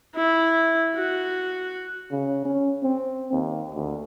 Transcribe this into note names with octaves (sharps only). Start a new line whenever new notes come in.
E4
F#4
C#3
C#4
C4
D#2
D2